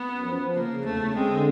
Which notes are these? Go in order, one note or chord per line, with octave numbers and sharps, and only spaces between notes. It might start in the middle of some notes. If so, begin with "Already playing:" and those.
Already playing: B3
F#2
F3
F3
C#3 A#3
C#3
E2 A3
C#3
G#3 C4
D3